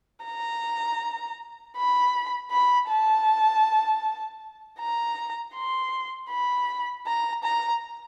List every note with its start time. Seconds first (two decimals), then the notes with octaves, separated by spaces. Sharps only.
0.25 A#5
1.77 B5
2.51 B5
2.89 A5
4.80 A#5
5.54 C6
6.30 B5
7.07 A#5
7.44 A#5